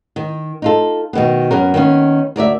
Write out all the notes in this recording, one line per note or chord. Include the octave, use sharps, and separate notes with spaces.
D#3
D#4 F4 A4
B2 D#3 B3
F#2 B3 C#4 A#4
D#3 A#3 B3 C#4
D2 A#4 D5 E5